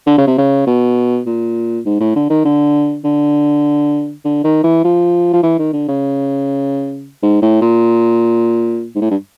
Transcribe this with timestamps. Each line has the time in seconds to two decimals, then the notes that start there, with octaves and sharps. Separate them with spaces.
0.07 D3
0.18 C#3
0.27 C3
0.38 C#3
0.67 B2
1.26 A#2
1.86 G#2
2.01 A2
2.16 D3
2.30 D#3
2.45 D3
3.05 D3
4.25 D3
4.44 D#3
4.64 E3
4.84 F3
5.33 F3
5.43 E3
5.59 D#3
5.73 D3
5.88 C#3
7.23 G#2
7.42 A2
7.62 A#2
8.96 G#2
9.01 A2
9.11 G2